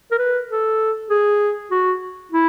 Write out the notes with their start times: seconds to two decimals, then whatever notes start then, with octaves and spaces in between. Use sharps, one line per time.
0.11 A#4
0.18 B4
0.49 A4
1.10 G#4
1.71 F#4
2.32 E4